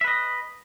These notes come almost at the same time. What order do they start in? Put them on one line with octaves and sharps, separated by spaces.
E5 B4 D#5